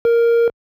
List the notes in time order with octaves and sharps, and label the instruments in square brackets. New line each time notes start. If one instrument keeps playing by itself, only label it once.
[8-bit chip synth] A#4